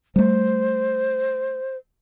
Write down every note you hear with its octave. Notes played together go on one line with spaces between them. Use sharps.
G3 A3 C5